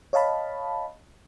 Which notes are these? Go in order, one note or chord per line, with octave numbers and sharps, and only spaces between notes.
C#5 D#5 F5 A5 B5